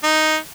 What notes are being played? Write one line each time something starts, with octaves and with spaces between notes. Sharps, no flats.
D#4